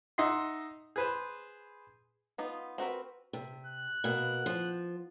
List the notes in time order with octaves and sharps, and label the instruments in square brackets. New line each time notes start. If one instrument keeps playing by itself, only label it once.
[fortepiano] D#4 D#5 E5 F#5 C6
G#4 B4 C5
[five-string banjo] B3 D#4 F4
C4 F#4 A#4 B4
[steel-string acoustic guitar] C3
[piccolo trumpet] F#6
[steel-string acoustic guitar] B2 A#3
F3